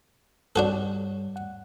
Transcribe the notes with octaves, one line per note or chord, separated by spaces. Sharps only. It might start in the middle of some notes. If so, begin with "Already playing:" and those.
G2 G3 D4 F#4 A4 C#5
F#5